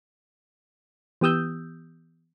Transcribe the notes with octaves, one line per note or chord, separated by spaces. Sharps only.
E3 B3 G4 D#6 E6 G6